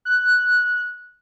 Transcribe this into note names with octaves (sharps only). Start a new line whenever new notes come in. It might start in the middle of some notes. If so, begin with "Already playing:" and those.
F#6